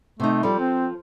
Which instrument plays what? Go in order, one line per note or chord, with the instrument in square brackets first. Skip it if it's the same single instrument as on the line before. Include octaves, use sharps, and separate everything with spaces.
[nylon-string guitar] C3 D#4 [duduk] A3
[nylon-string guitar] F3 A4 [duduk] G3
[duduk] C4